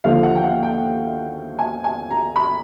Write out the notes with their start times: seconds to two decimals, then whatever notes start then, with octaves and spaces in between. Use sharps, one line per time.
0.04 D#2 D3 F3 F5
0.23 F#5
0.35 G5
0.44 F#5
0.63 G5
1.59 G#5
1.84 G#5
2.11 A#5
2.36 B5